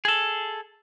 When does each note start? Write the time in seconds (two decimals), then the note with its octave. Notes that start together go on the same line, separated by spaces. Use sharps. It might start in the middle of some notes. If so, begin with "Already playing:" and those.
0.05 G#4 A4